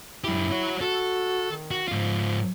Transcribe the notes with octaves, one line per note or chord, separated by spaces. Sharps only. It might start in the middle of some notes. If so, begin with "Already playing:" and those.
F#2 E4 G4
F#4 C#5
F#4 A4
D#3
F#4
G#2 F3 F4